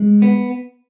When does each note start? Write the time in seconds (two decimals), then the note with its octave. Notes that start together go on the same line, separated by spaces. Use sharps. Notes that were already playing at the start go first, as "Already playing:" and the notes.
Already playing: G#3
0.22 B3